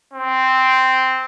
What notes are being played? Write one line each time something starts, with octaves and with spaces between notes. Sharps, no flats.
C4